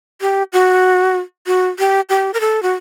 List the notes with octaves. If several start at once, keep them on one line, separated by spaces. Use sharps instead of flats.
G4
F#4
F#4
G4
G4
A#4
A4
F#4